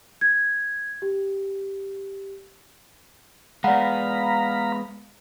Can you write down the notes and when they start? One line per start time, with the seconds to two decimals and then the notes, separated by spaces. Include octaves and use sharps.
0.21 G#6
1.02 G4
3.64 G#3 B3 D5 F5 F#5 A#5 B5